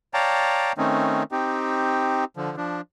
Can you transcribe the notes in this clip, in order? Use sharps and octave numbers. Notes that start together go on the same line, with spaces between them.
C#5 D5 F5 G5 A5 A#5
D#3 A3 C4 C#4 D#4
C4 D#4 G4
D3 F3
F3 D4